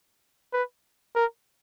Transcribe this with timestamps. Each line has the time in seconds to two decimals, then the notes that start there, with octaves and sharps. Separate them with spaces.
0.53 B4
1.15 A#4